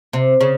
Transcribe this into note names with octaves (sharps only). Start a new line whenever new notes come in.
C3
C#3